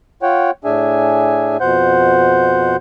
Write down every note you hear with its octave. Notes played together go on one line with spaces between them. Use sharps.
F4 C#5 F#5 G5
A2 D4 G#4 E5 G#5
F2 B2 C5 F#5 G6